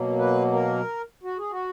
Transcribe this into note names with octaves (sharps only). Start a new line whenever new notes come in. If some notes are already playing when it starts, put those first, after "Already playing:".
Already playing: B2 F#3 A#3
B4
A#4
F#4
G#4
F#4